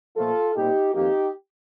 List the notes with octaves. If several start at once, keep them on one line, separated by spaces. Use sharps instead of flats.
A#2 F3 A3 F4 A4
A#2 G3 C4 D#4 G4
F2 D#3 A#3 D#4 G4